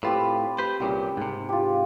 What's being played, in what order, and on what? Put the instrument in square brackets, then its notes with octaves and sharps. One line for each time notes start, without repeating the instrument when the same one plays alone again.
[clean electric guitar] A2 F4 [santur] C4 G4 B4
[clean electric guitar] G4 B4 C5
[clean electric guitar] C2 A#2 C#3 [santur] G4
[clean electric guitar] G#2 C3
[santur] F4 G4